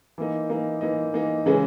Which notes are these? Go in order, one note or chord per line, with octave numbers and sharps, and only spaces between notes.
E3 A#3 D#4
E3 A#3 D#4
E3 A#3 D#4
E3 A#3 D#4
C#3 E3 G#3 C#4